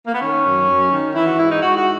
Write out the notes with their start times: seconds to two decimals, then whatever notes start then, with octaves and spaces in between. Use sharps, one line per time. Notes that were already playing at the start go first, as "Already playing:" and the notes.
0.07 A#3
0.13 B3
0.21 D#3 C#4
0.44 F#2
0.68 F#2
0.91 D#3
1.15 E3 E4
1.26 F#4
1.37 G#2 E4
1.50 D#4
1.62 G#2 F#4
1.77 F#4